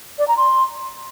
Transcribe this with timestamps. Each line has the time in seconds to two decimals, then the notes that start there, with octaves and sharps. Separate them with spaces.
0.19 D5
0.28 A#5
0.37 C6